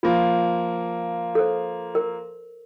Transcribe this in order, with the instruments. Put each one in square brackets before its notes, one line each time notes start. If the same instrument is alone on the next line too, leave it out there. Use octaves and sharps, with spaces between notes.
[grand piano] F3 A#3 [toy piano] F4
[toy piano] A4 C5
A#4